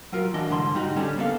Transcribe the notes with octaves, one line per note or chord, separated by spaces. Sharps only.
F#3 F4 A#4
E3 D4 F#4 D#5
C2 G#2 D3 C6
G#2 G3 D#4 F#4
D3 G3 C#4 D4 G4 A4
A#3 B3 A4 D5 F5